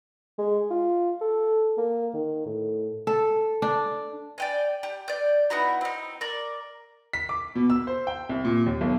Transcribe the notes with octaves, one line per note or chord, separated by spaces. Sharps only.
G#3
F4
A4
A#3
D#3
A2
A4
D4
D5 G5 G#5
G4
D5 G6
B3 D#4 E4 F#4
C4 D#4
A#4 D5
B6
D6
B2
E6
C5
G5
C2
A#2
D#2
B1